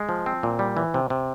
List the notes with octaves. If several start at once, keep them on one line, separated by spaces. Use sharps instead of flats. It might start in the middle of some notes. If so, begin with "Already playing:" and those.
Already playing: G#3
F3
C4
A#2
G3
E3
C3
C3